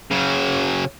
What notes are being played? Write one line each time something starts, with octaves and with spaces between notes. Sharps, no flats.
C#3 F#3